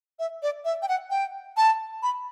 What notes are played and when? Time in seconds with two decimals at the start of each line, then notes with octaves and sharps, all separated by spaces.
0.19 E5
0.43 D5
0.65 E5
0.82 G5
0.88 F#5
1.11 G5
1.57 A5
2.03 B5